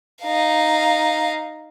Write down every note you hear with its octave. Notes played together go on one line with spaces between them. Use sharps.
D#4 F5